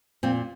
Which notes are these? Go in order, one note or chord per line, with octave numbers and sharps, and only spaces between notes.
A#2 C4